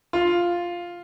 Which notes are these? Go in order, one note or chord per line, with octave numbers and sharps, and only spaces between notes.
F4